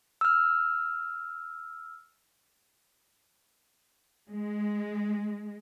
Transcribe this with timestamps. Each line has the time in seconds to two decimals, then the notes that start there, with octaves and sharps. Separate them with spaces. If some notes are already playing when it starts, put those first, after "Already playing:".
0.21 E6 F6
4.28 G#3